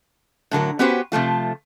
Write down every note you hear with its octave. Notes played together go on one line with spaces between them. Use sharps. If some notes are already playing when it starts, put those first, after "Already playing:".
A2 D3 F#3 A#4
B3 C#4 F#4 G4 B4 C5
C3 F3 A3 F4